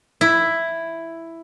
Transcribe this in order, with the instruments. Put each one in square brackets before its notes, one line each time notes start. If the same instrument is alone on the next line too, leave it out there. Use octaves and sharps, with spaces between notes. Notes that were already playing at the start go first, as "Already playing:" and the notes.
[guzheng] E4